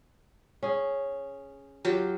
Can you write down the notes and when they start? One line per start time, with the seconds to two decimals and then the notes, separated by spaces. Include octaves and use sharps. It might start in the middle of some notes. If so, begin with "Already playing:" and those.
0.63 C#4 G#4
1.85 F#3 F4 G4